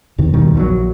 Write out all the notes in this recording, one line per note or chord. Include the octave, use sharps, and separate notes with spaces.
E2 C3 D#3
D#2 B2 D#3 G3
A#1 F3 F#3